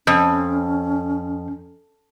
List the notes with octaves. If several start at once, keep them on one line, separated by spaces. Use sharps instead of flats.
F2 C#4